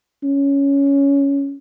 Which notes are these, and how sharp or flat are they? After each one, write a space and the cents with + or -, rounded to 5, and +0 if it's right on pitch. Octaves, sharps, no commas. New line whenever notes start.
C#4 +10